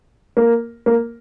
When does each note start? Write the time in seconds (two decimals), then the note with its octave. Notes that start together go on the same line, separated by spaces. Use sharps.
0.37 A#3
0.86 A#3